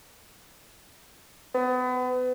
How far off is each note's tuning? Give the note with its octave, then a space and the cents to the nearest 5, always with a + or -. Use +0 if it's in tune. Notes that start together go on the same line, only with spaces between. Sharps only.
B3 +35